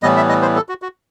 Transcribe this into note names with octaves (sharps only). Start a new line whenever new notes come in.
A2 E3 G3 B3 D#5
E5
D#5
C5
A4
F#4
F#4